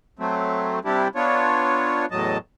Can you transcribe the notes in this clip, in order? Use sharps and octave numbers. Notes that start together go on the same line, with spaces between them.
F#3 A3 C4
C3 G3 D4 E4 G4
B3 D4 F4 C#5
E2 A2 F#3 D#5 A5